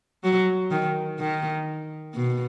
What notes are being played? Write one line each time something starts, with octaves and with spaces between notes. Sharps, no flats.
F#3
D#3
D#3
B2